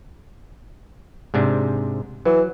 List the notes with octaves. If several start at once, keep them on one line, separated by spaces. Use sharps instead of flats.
G#2 C3 D4
E3 F#3